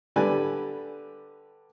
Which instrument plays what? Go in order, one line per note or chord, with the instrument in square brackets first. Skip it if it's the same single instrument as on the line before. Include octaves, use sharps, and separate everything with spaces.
[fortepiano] D3 G3 B4 D5 G#5